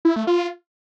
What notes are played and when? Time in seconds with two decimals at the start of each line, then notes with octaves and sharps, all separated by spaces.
0.05 E4
0.16 A3
0.27 F4